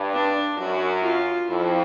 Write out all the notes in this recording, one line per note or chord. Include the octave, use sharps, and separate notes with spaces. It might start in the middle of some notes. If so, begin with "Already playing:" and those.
Already playing: G2
D4
F#2 F#4
F4
F2 E4